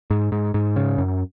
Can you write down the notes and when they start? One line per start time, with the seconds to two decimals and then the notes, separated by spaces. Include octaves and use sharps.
0.10 G#2
0.32 G#2
0.54 G#2
0.76 C#3
0.98 F#2